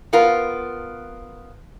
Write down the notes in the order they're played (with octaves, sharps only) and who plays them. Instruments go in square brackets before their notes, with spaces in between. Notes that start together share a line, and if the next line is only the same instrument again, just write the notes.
[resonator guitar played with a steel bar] B3 F4 A#4